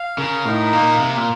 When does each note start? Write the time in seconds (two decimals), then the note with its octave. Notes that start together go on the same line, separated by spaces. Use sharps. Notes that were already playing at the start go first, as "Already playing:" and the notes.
Already playing: F5
0.18 C#3 A#4
0.45 A2 D#4
0.73 A#2 A#3
1.00 C3 A#4
1.17 A#2